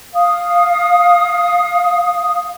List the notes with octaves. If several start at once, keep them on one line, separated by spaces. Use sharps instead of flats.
F5 D#6